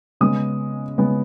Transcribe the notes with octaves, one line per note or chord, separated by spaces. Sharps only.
C#3 G#3 B3 D#6
C#3 G#3 B3